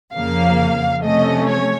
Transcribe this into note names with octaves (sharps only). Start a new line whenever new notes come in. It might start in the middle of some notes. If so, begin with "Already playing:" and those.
F2 C#3 F3 A#3 F5
C3 F3 A3 C#4 D#5
C#5